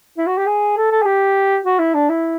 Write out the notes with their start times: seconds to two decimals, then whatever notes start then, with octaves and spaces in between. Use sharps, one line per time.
0.18 E4
0.27 F#4
0.38 G4
0.46 G#4
0.77 A4
0.91 A4
1.02 G#4
1.05 G4
1.65 F#4
1.79 E4
1.94 D4
2.09 E4